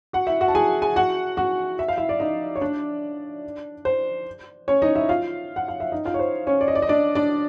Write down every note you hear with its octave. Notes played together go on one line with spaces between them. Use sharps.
F#4 F#5
E4 E5
F#4 F#5
A5
G#4 G#5
G#4 G#5
F#4 F#5
F#4 F#5
E5
F5
E4 E5
D5
D#4 D#5
C#5
D4 D5
C5
C#4 C#5
D#4 D#5
E4 E5
F4 F5
F#5
F5
E5
D#4 D#5
F4 F5
C#5
C5
C#4 C#5
D5
D#5
D5
D#5
D4 D5
D4 D5